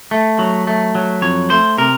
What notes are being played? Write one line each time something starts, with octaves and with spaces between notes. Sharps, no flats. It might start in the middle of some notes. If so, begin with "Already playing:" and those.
A3
F#3
A3
F#3
F2 C#5
A3 C5
C3 A#4